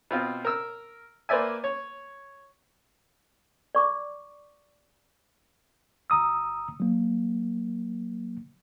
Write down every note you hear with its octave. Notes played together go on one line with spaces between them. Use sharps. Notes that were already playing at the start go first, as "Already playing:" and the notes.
B2 C4 F4
A#4 E6
A#3 B4 C5 D5 E5 G#5
C#5
D5 C#6 D6
G1 A#5 D#6 E6
F#3 A#3